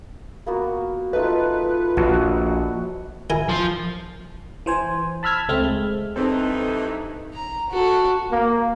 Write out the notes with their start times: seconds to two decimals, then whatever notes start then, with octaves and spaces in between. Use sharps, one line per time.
0.47 A#3 B3 F#4
1.13 A3 D#4 F4 B4
1.97 A#1 F#4
3.30 E4 A#4 G#5
3.49 F3
4.66 E3 C5 G#5
5.23 A5 B5 E6 F6 G#6 B6
5.49 C#2 A3 C4 F6
5.63 G#3
6.16 G2 E3 C4 D#4 A4 A#5
7.34 A#5
7.69 F#4 A4
8.31 A#3